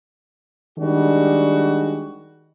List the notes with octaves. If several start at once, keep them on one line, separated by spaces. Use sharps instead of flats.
D#3 G3 G#3 D4 F#4